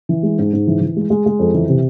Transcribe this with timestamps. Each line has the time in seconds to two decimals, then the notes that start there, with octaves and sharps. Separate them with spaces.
0.09 E3
0.23 G#3
0.39 G#2
0.53 G#2
0.67 E3
0.81 E3
0.96 G#3
1.10 G#3
1.26 G#3
1.39 F2
1.54 E3
1.69 C3